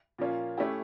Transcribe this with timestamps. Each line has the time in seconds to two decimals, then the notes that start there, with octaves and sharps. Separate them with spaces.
0.18 A#2 F3 A#3 C#4 F4
0.58 A3 C#4 E4 G4